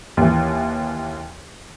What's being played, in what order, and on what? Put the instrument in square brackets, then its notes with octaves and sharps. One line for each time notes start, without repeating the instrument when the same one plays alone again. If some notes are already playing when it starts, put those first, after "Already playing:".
[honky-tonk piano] D#2 E3